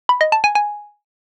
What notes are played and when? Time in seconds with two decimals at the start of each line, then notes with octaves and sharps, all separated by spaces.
0.09 B5
0.21 D#5
0.32 A5
0.44 G#5
0.55 G#5